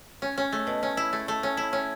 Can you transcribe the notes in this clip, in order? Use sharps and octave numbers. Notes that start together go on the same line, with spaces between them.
C#4
C#4
A3
B2
C#4
E4
A3
A3
C#4
E4
C#4